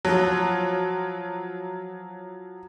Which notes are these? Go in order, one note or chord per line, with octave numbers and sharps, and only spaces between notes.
F3 F#3